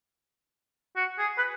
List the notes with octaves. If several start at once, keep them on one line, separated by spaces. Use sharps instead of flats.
F#4
G#4
B4